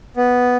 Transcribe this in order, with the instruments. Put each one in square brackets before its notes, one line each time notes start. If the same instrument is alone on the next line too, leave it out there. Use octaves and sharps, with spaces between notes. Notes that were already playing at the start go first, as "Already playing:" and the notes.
[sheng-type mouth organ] B3